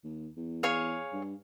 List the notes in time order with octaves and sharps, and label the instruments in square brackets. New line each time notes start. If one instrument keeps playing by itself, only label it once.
[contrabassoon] D#2
E2
[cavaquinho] G#4 C#5 F5
[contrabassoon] G2